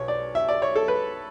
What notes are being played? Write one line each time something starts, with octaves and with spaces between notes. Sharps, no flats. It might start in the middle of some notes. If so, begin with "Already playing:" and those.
Already playing: B1 C#5
D5
E5
D5
C#5
A4
B4